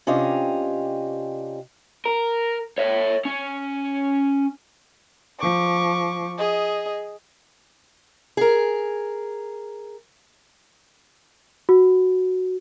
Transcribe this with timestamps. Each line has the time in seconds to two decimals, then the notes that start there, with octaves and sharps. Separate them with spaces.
0.07 C3 C#4 D4 F4 G4 D#5
2.05 A#4
2.78 C#5 E5
3.25 C#4
5.39 F3 C#6 D6
6.37 G#4 D#5
8.37 G#4 A#4
11.69 F#4